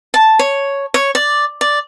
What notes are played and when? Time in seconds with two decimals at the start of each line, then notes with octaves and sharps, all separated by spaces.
0.14 A5
0.39 C#5
0.94 C#5
1.15 D5
1.61 D5